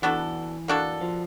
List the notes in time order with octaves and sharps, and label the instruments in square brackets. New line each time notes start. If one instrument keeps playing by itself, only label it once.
[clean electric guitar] E3 [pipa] B3 D4 F#4 A4
[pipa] A#3 D4 F#4 A4
[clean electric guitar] F3